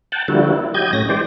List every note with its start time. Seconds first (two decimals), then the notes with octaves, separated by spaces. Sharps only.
0.12 F#5 G5 A5
0.28 D3 F3 G3 A#3 E4 F#4
0.52 E4
0.74 F#3 G4 D#5 G6 G#6
0.93 A2 C#4 A#6
1.09 E3 G#3 G4 C5 D5